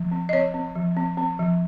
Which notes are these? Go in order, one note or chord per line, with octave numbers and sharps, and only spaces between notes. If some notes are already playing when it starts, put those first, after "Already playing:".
Already playing: F3
C4
D#5
C4 C#5
C4
F3
C4
C4
F3